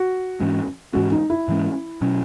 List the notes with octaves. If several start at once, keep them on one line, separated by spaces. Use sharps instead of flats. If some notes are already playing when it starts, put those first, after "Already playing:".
Already playing: F#4
G#2 E3 G#3 C#4
G#2 E3 G#3 C#4 F#4
D#4
E4
G#2 E3 G#3 C#4
B2 F#3 C#4